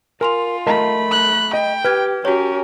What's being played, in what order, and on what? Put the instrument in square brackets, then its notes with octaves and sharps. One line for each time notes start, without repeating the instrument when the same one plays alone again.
[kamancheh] F4 [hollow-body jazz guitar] A#4 [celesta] G#5 C6 F7
[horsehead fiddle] A3 B5 [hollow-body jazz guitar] A#4 D#5 A5
[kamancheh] F#6
[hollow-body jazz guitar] D#5 [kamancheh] G5
[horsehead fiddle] G4 [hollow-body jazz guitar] B4 [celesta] F6 G#6
[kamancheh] C#4 [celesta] F#4 C#5 [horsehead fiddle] G4 A#4